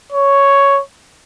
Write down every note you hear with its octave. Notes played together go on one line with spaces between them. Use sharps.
C#5